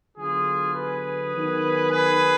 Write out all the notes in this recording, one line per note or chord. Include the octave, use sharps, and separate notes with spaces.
D3 F#3 B3 F4 G#4
G#4 B4
D#3 F#3 B3
G#4 B4